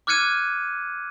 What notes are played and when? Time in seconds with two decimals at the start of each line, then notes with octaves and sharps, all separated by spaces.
0.07 D6 F6 F#6 G#6 C#7 D#7